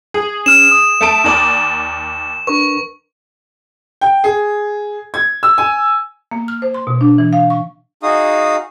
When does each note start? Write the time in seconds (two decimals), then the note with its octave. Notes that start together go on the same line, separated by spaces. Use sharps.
0.14 G#4
0.46 C#4 F6 E7
0.71 D#6
1.01 A3 A5 D7
1.24 D#2 A#4 D5
2.47 D4 A#4 B4 C#6
4.01 G5
4.24 G#4
5.14 G#6
5.43 E6
5.58 G#5
6.31 A#3
6.48 F6
6.62 C5
6.74 C6
6.87 B2
7.01 D4
7.18 E3
7.33 F5
7.50 C#6
8.03 D#4 F#4 G#4 F5 D#6